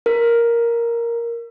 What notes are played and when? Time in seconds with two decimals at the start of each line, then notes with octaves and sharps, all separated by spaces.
0.06 A#4